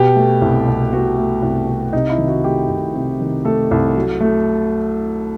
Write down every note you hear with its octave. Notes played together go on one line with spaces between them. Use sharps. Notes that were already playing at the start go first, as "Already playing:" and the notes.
Already playing: B2 G4
A3
C2
C2
B2 F#4
A3
C2
C2
C3 D#4
E4
D#3
F#4
A3 G4
C2
C3
D#3
A3 A4
C2
F#3
A3